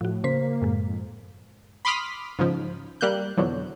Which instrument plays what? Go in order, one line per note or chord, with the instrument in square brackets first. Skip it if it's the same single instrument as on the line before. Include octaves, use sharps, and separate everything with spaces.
[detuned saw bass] A2 [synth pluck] F3 F#4
[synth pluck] C#3 C5 B6 [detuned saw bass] A#3
[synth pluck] F#2 A2 G#3
[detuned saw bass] F2
[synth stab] B5 C6 D6 D#6 F6 B6
G#2 C#3 F3
G3 A#3 F#6 G6
F2 B2 D3 E3 F#3